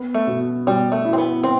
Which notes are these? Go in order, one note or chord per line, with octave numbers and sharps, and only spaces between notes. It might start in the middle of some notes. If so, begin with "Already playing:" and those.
Already playing: B3
A3
B2
B2 G3
A3
E4
C4
B3
B3 C4